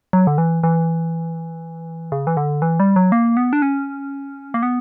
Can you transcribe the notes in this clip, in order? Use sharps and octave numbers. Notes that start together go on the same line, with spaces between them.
F#3
D3
E3
E3
C#3
E3
D3
E3
G3
F#3
A#3
B3
D4
C#4
A#3
B3